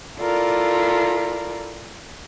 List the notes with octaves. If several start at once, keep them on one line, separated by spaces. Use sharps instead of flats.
E4 F4 A4 A#4 D5